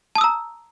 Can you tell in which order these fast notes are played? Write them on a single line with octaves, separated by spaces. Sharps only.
A5 D#6 E6 A#5